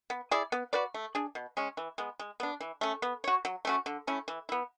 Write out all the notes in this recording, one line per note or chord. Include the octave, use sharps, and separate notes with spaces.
B3
E4 G#4 D5
B3
F#4 B4 D5
A3
D4 G#4
B2
G#3 C#4
E3
G#3 B3
G#3
B3 D4
E3
A3 C#4
B3
F#4 C#5
F#3
A3 C#4 F#4
D3
A3 C#4 E4
E3
B3 E4